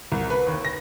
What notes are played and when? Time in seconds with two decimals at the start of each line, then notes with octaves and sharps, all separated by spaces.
0.12 C2
0.30 B4
0.47 D#2
0.65 A#6